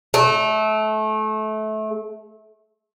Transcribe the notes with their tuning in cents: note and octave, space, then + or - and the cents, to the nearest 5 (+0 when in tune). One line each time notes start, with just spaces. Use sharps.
A3 -25